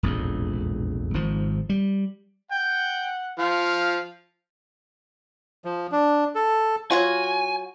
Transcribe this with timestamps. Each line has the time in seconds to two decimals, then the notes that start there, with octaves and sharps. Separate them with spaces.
0.03 E1 A#1 F2 G#2
1.14 G#1 G#2 F3
1.69 G3
2.52 F#5 G5
3.39 F3 F5
5.65 F3
5.92 D4
6.35 A4
6.91 F#3 F4 F#4 G#5